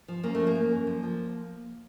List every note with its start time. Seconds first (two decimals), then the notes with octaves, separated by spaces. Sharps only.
0.08 F3
0.23 F#2 A#3
0.35 A3
0.40 F3
0.47 A#3
0.55 F#2
0.72 F#2
0.87 F3
1.03 F3